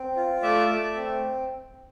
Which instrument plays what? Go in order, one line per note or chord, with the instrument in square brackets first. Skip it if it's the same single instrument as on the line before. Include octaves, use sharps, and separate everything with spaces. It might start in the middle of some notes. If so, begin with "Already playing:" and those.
Already playing: [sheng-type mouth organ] C4
F4
A3 D5 E5
A3
C4